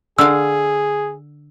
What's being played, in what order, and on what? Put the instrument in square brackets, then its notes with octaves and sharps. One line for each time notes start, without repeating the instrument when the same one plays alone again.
[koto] D3 F5 [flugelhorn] G#4 [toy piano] E6